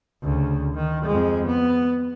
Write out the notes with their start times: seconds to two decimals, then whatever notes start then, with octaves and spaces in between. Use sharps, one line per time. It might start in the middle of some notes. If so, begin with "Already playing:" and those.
0.23 D2 C#3
0.75 D#3
1.05 F2 G#3
1.46 B3